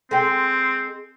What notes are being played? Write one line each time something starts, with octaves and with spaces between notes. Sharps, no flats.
G#3 C4 G5